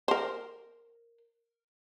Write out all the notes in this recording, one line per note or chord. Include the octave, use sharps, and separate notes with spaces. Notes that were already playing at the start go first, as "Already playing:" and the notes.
A#4 C5